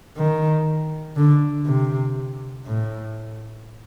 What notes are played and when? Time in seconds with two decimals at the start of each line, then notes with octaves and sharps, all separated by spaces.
0.16 D#3
1.16 D3
1.66 C3
2.66 A2